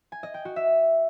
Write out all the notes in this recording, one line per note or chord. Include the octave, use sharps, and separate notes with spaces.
G#5
D#5
G5
F#4
E5